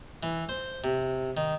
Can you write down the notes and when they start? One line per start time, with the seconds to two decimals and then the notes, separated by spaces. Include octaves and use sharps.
0.23 E3
0.49 C5
0.84 C3
1.37 D#3